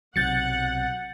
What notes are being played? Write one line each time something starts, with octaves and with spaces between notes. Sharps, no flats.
B1 C3 F#3 F#5 G6 A6 C#7